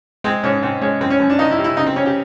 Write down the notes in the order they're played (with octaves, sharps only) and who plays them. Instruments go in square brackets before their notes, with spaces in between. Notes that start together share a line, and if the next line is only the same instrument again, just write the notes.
[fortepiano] G#3 C4
G#2 C#4
G#2 C4
G#3 C#4
F#2 C4
C#4
F#2
D4
D#3 D#4
E4
G3
E4
C#3 D#4
C4
C#3 C#4
G4